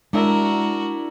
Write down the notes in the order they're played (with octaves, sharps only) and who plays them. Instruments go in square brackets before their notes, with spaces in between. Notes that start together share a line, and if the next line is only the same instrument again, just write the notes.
[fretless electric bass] G#3 [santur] D4 E4 E6 [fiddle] F#4 A#4